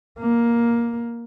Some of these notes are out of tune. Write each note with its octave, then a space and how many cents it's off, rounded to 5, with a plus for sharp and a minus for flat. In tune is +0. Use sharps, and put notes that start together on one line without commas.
A#3 +10